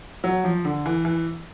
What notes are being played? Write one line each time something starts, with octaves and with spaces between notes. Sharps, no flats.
F#3
F3
D3
E3
E3